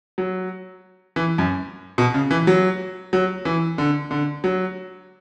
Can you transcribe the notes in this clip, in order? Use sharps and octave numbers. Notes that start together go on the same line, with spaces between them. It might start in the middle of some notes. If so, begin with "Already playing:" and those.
F#3
E3
F#2
B2
C#3
E3
F#3
F#3
E3
D3
D3
F#3